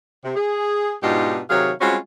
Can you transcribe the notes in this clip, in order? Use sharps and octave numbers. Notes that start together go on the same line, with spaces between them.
C3
G#4
G#2 B2 D4 D#4 F4 G4
C3 D#3 F#3 G#4 C#5 F5
G3 G#3 C4 C#4 F4 F#4